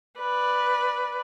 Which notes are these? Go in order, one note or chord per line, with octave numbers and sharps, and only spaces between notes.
B4 D5